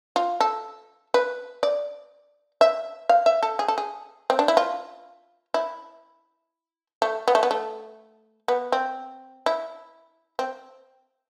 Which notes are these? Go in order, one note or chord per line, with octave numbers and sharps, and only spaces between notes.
F4
A4
B4
D5
E5
F5
E5
A4
G#4
A4
G#4
C4
D4
E4
F4
E4
A3
B3
A3
B3
A3
B3
C4
E4
C4